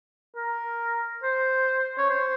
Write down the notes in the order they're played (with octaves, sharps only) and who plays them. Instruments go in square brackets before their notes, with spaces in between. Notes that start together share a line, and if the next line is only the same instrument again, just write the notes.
[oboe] A#4
C5
C#5
C5